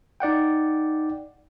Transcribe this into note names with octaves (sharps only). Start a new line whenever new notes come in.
D#4 D5 F#5 G5